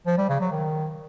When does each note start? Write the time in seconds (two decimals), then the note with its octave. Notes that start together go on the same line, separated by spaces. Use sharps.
0.07 F3
0.18 G3
0.29 C#3
0.40 F#3
0.52 D#3